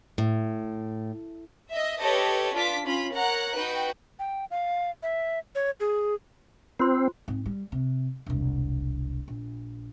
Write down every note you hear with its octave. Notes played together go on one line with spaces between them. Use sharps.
A2
D#5 E5
G4 A4 B4 C#5 D#5
D4 F4 D6 B6
C#4 F4 B5
A#4 C#5 F#5 A#5 F#6
D#4 F#4 B4 G5
G5
F5
E5
C#5
G#4
C4 F4 C5 C6
G#2 C4
G3
C3
E1 C2
A#1